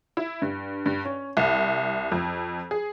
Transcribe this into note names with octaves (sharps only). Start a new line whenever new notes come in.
E4
G2
G2
C#4
C2
F2
G#4